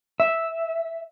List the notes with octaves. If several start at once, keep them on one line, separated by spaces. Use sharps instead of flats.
E5